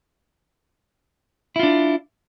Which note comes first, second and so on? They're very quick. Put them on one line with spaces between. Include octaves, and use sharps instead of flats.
E4 F4 D4